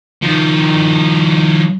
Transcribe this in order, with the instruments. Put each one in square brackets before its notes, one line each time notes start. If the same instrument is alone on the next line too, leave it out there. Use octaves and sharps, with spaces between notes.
[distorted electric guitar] D#3 F3